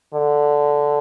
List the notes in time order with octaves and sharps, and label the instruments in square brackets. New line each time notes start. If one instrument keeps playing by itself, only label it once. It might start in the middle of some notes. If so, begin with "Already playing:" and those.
[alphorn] D3